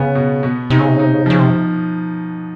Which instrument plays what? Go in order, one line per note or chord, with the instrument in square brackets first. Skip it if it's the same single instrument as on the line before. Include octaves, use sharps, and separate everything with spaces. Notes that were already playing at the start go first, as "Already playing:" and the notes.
Already playing: [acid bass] C#3 [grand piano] B3
[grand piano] B2
B2
[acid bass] C3 [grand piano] D#4
[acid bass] C#3
C3
[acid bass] C#3 [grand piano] D#4
[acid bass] C3
C#3
C3
[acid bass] C#3 [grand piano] F3
[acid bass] C3